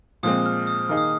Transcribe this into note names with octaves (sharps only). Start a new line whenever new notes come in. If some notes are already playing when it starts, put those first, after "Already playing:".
A#2 F3 G#3 C4 D#6
F6
D#6
D#3 A#3 D#4 G#4 F6
D#6